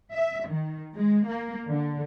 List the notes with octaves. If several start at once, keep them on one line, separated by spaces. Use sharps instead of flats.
E5
D#3
G#3
A#3
D3